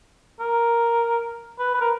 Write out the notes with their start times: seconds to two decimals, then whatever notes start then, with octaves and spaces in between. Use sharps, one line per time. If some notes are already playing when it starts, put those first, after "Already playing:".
0.40 A#4
1.59 B4
1.74 B4
1.81 A#4